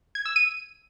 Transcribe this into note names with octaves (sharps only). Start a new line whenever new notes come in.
G#6
E6
D#7